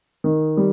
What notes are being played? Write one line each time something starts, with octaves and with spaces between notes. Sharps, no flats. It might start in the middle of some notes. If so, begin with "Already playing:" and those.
D#3
G3